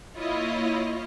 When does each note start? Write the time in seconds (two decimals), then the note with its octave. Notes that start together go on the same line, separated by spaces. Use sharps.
0.16 A#3 E4 F4 C#5 D#5